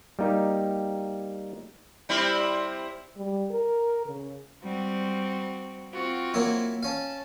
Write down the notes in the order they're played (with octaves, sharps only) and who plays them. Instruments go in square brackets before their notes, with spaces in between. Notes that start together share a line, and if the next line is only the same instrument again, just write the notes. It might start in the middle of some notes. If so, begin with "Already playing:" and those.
[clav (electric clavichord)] G3 A#3 D#4 G4
[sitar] G3 C4 E4
[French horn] G3
A#4
C#3
[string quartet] G3 C4 F#4
C4 F4 F#4
[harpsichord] F#3 A#3 E4
[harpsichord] C#4 F5 [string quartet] A5